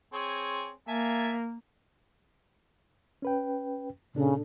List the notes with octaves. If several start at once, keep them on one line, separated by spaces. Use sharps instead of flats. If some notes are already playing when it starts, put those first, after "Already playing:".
C4 G#4 C#5
A#3 E5 G#5 A5
C#4 B4 G5
A#2 C#3 D4 A4